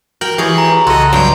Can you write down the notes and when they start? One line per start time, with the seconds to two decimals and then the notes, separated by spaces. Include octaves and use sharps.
0.21 F#4 A#4 G5 F#7
0.38 E3 G4 G#4 C#5
0.58 A#5
0.87 C2 C#3 F#4 A4 D#5 C6
1.13 G2 F#3 G5 A#5 G6